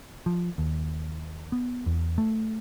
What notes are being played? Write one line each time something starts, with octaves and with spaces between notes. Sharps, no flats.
F3
D#2
B3
E2
A3